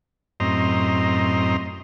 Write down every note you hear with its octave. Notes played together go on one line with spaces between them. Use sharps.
F#2 A2 C4 D#5 A#5 C6